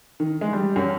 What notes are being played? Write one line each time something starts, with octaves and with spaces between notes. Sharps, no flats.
D#3
G#3
G3
F#2